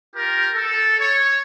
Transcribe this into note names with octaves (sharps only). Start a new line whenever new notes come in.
F4 G4 A#4
A4
C#5